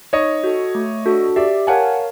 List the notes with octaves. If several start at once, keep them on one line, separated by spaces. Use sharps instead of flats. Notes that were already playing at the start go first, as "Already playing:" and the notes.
D#4 C#5 D#5
F#4 A4
A3
D4 F#4 A4
G4 D5 E5
A#4 C#5 F5 F#5 G#5 A5